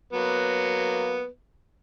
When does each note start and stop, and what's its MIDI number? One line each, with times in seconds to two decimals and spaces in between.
0.13 1.27 54
0.13 1.27 58
0.13 1.27 59